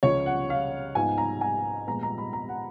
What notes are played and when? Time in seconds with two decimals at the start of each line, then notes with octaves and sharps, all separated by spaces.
0.03 C#2 C#3 F3 C#5
0.26 F#5
0.50 F5
0.95 G#2 F3 B3 D#4 G#5
1.18 A#5
1.41 G#5
1.87 A#2 F3 G#3 B3 A#5
2.03 A#5
2.18 B5
2.33 A#5
2.49 F#5